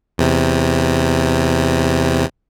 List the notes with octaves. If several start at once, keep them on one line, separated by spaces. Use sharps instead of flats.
E2 C3